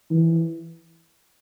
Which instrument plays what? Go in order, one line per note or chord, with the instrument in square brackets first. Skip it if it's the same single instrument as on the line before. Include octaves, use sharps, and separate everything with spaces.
[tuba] E3